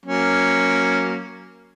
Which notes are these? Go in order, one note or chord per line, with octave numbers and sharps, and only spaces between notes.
F#3 A#3 C#4